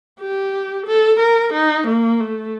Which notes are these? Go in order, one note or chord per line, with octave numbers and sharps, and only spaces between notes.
G4
A4
A#4
D#4
A#3
A3